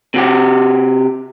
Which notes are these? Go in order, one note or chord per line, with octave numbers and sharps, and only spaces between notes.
C3 F#4 G4